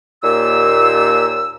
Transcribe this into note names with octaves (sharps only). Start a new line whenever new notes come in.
D#2 A#2 E6